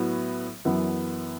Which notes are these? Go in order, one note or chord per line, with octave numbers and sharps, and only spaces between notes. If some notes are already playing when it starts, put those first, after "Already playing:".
Already playing: A2 F#3 B3
F#2 E3 B3